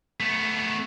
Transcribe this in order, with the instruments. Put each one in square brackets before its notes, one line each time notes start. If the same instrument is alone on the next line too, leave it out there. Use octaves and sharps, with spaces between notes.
[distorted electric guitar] A3 B3